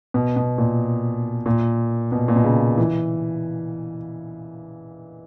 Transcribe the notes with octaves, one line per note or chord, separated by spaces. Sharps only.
B2
B2
A#2
A#2
B2
A#2
B2
C#3
E3